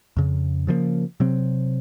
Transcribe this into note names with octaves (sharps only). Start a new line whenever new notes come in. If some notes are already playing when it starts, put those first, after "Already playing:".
F2 C#3
C#3 F3 F#3 A#3
C3 F#3 C4